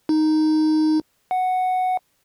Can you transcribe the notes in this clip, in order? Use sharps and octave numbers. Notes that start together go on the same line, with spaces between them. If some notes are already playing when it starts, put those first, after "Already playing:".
D#4
F#5